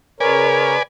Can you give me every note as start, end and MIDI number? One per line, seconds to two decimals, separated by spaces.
0.20 0.76 49
0.20 0.76 70
0.20 0.83 71
0.20 0.76 73
0.20 0.83 74
0.20 0.83 80